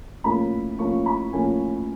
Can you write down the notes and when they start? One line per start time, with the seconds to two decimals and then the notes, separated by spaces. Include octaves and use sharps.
0.24 A2 F3 A#3 C#4 B5
0.79 A2 F3 A#3 C#4 C#6
1.06 B5
1.33 A2 F3 A#3 C#4 G#5